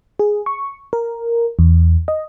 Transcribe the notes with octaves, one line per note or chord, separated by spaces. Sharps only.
G#4
C#6
A#4
E2
D#5